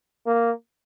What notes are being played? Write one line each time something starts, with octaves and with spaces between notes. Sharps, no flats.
A#3